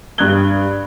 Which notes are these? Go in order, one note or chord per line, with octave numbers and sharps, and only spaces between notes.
G2 G3 D#6 F#6 G#6 G7